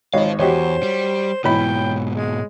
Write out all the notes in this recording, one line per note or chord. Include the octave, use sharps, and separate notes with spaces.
G#1 C5 C#5 D#5 F5
E2 F#4 G4 C5 C#5
G3
G#2 B2 E3 C#5 G5 B5
G#3